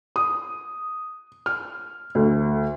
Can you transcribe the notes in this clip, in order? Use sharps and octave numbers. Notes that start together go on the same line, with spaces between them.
D#6
F6
D2